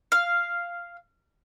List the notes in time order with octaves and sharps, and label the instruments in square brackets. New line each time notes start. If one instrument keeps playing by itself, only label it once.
[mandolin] F5